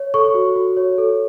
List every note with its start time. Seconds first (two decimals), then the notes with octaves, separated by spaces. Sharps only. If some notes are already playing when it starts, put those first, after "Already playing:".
Already playing: C#5
0.14 A4 C#6
0.34 F#4
0.56 F#4
0.77 C#5
0.98 A4